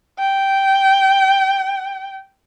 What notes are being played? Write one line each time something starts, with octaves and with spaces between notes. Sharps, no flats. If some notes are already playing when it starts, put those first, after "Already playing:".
G5